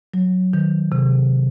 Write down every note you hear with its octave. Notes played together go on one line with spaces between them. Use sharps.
F#3
D#3
C3